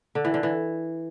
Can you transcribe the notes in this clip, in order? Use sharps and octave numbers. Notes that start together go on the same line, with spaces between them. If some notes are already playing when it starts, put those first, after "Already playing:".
D3
E3
D3
E3